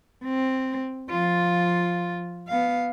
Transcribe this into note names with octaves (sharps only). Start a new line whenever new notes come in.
C4
F3 F4
B3 F5